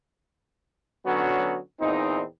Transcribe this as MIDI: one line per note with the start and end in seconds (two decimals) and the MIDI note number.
1.05 1.57 50
1.05 1.57 54
1.05 1.57 59
1.05 1.57 61
1.05 1.57 66
1.80 2.22 40
1.80 2.22 46
1.80 2.22 60
1.80 2.22 63